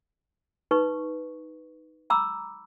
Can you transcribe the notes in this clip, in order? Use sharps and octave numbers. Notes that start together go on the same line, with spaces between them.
D#4 B4 C#6
A#5 B5 D6 E6